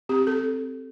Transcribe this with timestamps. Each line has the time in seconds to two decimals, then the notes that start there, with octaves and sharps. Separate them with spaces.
0.09 C4 G4
0.27 A4
0.43 C4